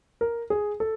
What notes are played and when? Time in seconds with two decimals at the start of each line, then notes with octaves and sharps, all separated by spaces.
0.21 A#4
0.50 G#4
0.80 A4